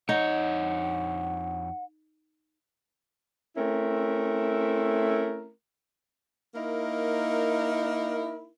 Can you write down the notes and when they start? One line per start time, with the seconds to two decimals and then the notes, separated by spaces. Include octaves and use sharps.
0.09 F2 D#4 C#5 F#5
3.57 A3 C4 C#4 E4 A#4
6.55 A#3 D#4 E4 A#4